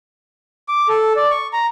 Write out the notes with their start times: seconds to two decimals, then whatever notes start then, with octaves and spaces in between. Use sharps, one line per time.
0.68 D6
0.89 A4
1.16 D5
1.31 C#6
1.53 A#5